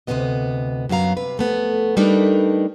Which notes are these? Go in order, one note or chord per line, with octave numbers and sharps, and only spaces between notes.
D2 C3 F#3 G#3 B3 D#5
F#2 F#3 B3 F5 A#5
C3 B4
F2 A3 B3
G3 A3 D4 D#4 A#4 B4